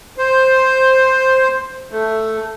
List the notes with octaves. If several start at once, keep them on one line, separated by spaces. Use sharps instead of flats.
C5
A3